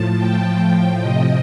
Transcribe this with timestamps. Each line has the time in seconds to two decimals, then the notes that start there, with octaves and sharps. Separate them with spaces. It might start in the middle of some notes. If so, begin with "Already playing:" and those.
Already playing: A2 F3 A5
0.17 G5
0.45 A2 F3
1.01 C3 F3 D#5